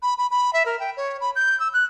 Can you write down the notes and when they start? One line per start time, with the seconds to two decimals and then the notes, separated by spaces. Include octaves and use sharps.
0.02 B5
0.18 B5
0.31 B5
0.53 E5
0.66 A#4
0.79 G5
0.97 C#5
1.21 B5
1.36 G6
1.60 E6
1.73 F#6